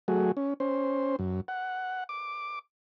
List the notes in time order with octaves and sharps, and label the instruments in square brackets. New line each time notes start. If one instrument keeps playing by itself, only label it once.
[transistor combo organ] F#3 A3 F#4 G#4
C#4
C#4 C5
F#2
F#5
D6